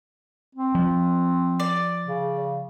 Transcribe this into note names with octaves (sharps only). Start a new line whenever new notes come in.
C4
F3
D5
C#3